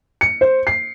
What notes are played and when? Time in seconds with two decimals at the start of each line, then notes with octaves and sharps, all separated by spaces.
0.21 C#7
0.41 C5
0.67 C7